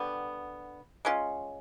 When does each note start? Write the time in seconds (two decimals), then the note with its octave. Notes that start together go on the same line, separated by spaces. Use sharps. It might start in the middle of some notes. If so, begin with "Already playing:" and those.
Already playing: D3 G3 B3
1.05 G#3 C#4 F4